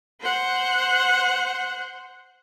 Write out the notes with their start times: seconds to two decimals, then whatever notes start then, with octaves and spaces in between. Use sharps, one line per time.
0.21 C5 F#5